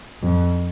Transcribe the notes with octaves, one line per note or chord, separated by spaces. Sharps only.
F2